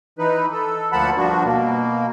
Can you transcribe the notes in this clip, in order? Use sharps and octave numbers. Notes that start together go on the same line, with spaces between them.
E3 D#4 B4
A4
D2 F3 A#3 F#5 A5 B5
G2 F3 D4 F#4
B2 A#3